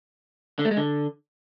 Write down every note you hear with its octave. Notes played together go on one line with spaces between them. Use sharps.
D3
A3
G#3
D3